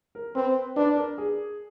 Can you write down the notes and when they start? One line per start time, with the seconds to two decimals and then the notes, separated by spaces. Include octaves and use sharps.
0.15 A#4
0.35 C4 B4
0.76 D4 B4
0.96 A#4
1.18 G#4